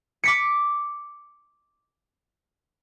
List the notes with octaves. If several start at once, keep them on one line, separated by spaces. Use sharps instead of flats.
D6 B6 C#7